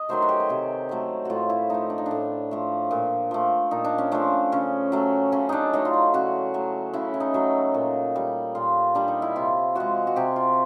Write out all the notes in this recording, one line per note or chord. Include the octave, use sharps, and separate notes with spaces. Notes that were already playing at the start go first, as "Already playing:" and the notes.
Already playing: D#5
D#3 F#3 A3 C5
F#4
G4
G#4
C3 G4
D#3 F#3 A3
A2 F4 F#4
E4
F3 A3 D#4
D4
D#4
D4
A2
F3 A3
A#2
F3 A3
A#2 D#4
D4
C#4
F3 A3 D4
C#3 C#4
F#3 A3
C#3 C#4
D4 D#4
F#3 A3 D#4
F4
E4
C#3 F#4
F#3 A3
C#3 E4
E4
D#4
F#3 A3
A#2
G3
A#2 F4
G3 D4
D#4
E4
C3 F4
F3 G#3 F#4
F#4
C3 G4
F4